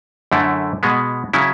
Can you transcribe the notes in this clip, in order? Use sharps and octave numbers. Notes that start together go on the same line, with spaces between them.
F#2 D3 A3 E4
B2 G#3 B3
C#3 F#3 C#4 E4